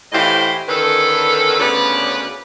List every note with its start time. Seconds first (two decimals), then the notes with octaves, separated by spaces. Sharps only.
0.13 A2 E3 G4 C5 D#5 F5
0.68 D3 D#3 C#4 A4 B4
1.59 D2 C#3 B3 B4 C#5 D5